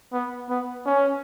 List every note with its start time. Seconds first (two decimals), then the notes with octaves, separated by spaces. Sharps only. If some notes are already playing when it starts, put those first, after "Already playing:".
0.13 B3
0.49 B3
0.86 C#4